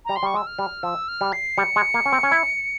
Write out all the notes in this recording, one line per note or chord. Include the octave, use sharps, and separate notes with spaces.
G3 A#5
C6
G3 C#6
G#3 E6
F6
G3
F3 E6
F6
G3
C7
G3 C#7
G#3
A#3
C#4
C4
C#4
E4